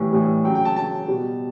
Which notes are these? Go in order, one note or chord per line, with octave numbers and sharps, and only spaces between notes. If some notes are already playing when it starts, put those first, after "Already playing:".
Already playing: A2 E3 G3
A2 E3 G3
C#3 F#3 G5
G5
A5
C#3 F#3 A5
B2 G3